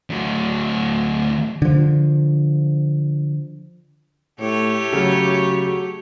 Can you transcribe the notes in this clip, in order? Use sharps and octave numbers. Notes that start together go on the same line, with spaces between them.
D2 F#3
D3 F3
A2 A3 G4 C#5
C#3 F#3 F#4